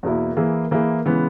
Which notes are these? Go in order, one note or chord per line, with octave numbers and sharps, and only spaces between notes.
E2 B2 A#3 E4
E3 A#3 E4 G#4
E3 A#3 E4 G#4
C#3 E3 G#3 B3